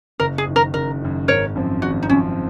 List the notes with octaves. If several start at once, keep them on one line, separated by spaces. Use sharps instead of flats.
F#1 A#4
G#4
F#2 D#3
A#4
F#1 A#4
F#2 D#3
G#1 A#4 C#5
F#2 F3 C4
G#1 F#4
D#4
F#2 F3 C4 C#4